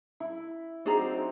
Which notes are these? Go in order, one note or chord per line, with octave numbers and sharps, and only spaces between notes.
E4
F#3 C4 D4 D#4 G#4 A#5